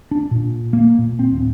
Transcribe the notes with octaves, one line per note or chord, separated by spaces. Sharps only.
D4
A#2
A#3
A#2
C4
D1